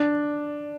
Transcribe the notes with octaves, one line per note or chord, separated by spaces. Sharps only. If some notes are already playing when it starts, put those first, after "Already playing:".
Already playing: D4